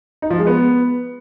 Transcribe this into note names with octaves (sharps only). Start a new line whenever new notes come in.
D#4
F3
G#3
B3